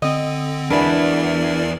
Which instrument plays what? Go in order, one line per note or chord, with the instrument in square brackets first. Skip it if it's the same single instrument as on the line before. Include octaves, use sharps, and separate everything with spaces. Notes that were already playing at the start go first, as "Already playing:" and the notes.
[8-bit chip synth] D3 C4 [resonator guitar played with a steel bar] D#5
[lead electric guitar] E2 E4 [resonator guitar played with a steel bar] G#3 F#4 B4 [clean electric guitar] D4 [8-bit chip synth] A#4 D5